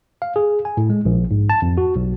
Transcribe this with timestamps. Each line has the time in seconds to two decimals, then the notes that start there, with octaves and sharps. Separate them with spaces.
0.22 F5
0.36 G#4
0.65 G#5
0.77 A2
0.90 G#3
1.05 A#1
1.31 G#2
1.50 A5
1.62 F2
1.78 F#4
1.96 B1